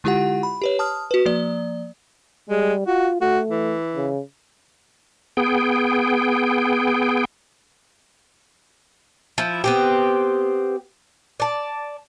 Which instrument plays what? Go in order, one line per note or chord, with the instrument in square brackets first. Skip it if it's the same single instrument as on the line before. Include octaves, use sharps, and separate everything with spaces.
[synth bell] D3 G#3 E4 F4 G4 F#5
B5
G4 B4 C#5
A5 D#6 F6
F#4 B4
F3 A#3 D5
[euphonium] G3 [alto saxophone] G#3
[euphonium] F4 [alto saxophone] F#4
[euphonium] A3 [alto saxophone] F#4
[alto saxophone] E3
[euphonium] C#3
[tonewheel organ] B3 G#4 G5
[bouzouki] F3 E4
B3 C4 G4
D5 A5